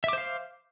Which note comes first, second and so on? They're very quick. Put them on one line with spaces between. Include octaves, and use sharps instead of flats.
E5 D6 C5 F5